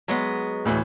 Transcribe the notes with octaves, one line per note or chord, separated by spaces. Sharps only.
F#3 G#3 B3
D2 A2 E3